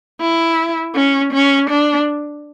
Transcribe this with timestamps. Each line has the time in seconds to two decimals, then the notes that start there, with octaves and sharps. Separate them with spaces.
0.21 E4
0.95 C#4
1.33 C#4
1.70 D4